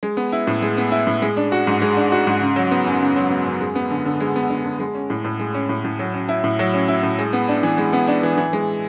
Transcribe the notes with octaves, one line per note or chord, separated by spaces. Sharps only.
G#3
B3
E4
A2
G#3
B3
E4
A2
G#3
D4
F#4
G#2
G#3
D4
F#4
G#2
C#3
F#3
B3
F#2
C#3
F#3
B3
F#2
G#3
B3
D3
D3
G#3
B3
D3
D3
G#3
C#4
A2
A2
G#3
C#4
A2
A2
F#3
C#4
E4
A2
F#3
C#4
E4
A2
G#3
B3
D4
E3
G#3
B3
D4
E3
E3
G#3